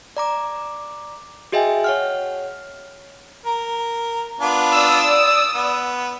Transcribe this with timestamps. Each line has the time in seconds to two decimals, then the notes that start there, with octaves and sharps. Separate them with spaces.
0.17 D5 A#5 D6
1.52 F#4 G#4 D#5 E5 G5 G#5
1.84 C#5 F#5 F6
3.46 A#4
4.40 B3 D4 F4
4.75 D5 D#6 E6
5.55 B3